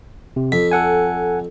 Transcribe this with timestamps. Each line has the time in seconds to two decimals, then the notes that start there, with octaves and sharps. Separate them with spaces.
0.36 C3
0.52 F2 B6
0.71 A4 F#5 G#5